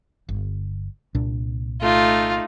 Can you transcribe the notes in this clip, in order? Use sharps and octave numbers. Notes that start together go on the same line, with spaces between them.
G1
C2 A#2 D4
A3 D#4 F4